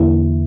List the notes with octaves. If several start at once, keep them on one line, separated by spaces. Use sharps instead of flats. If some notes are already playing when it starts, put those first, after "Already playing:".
Already playing: E2 D3 A#3 E4